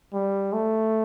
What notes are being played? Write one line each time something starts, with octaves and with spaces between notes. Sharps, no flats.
G3
A3